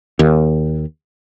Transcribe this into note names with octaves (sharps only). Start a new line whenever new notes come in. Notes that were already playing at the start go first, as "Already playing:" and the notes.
D#2